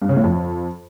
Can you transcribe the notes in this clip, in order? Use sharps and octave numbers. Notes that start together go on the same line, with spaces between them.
G2
C#3
A2
F2